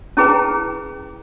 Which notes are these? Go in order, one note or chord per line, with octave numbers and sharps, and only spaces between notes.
C#4 E4 G#4 B4 G5 A#5